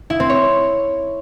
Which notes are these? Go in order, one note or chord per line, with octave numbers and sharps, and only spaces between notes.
E4
C4
C#5